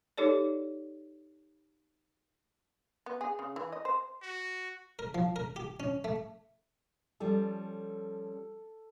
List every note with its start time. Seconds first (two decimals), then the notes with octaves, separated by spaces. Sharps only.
0.17 D#4 G4 A4 C#5 D5
3.06 B3
3.21 G#4
3.39 C#3
3.56 E3
3.72 D#5
3.85 C5
4.22 F#4
4.99 A#4
5.15 F3
5.36 A#4
5.56 G4
5.80 C#4
6.04 A3
7.20 F3 G3 C#4 A4